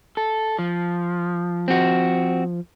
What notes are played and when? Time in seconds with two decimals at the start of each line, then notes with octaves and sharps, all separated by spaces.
0.17 A4
0.59 F3
1.68 C4 F#4